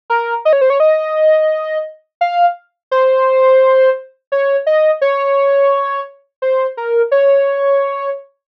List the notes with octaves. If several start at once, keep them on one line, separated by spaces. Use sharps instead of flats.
A#4
D#5
C#5
C5
C#5
D#5
F5
C5
C#5
D#5
C#5
C5
A#4
C#5